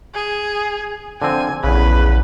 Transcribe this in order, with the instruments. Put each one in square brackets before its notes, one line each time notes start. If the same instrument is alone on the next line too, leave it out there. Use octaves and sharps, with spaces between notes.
[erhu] G#4
[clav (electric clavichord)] D3 F3 C4 [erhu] G#5
[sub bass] A#1 [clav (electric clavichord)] E2 C#3 [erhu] B4